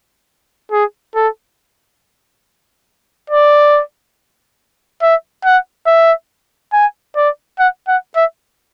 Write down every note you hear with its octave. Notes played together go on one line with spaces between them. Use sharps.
G#4
A4
D5
E5
F#5
E5
G#5
D5
F#5
F#5
E5